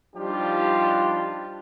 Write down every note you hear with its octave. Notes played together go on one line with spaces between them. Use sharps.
F3 G3 D4 D#4 F4 G4